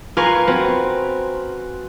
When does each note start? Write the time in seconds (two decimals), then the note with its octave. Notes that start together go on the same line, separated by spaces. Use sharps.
0.17 F4 A#4 B4 G#5 C6 C#6
0.47 C4 F#4 B4